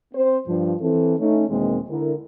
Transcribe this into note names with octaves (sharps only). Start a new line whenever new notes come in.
C4 C5
G2 F3
E3 C4 A4
A3 C#4 D#4
E2 B2 D#3 G#3 A#3 C4
D3 E4 A#4